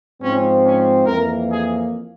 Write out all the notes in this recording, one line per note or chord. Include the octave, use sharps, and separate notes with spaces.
G#2 F3 C4 C#4
C#4
F2 E3 A#3 A#4
G#4